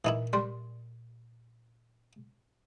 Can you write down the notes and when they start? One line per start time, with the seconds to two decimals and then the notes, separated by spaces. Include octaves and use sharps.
0.05 A#2 E3 D#4 E4
0.33 G3 C6